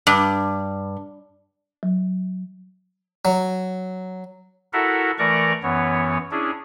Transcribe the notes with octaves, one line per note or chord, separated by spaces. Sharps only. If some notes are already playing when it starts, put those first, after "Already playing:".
G2
F#3
F#3
E4 F#4 A4 A#4 E5 F#5
E3 A3 A#4 D5 A#5 C#6
F#2 E3 B3 C#5
C#4 D4 E4 G#4